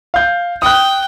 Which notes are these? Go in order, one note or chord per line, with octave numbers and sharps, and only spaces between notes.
F5 G6
G5 D#6 F#6